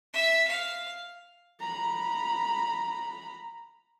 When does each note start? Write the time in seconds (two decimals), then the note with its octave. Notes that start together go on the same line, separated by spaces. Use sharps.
0.14 E5
0.48 F5
1.60 A#5 B5